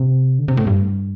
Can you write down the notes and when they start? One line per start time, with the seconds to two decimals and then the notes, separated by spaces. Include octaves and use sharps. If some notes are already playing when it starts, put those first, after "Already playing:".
Already playing: C3
0.39 D3
0.48 C3
0.57 A2
0.67 G2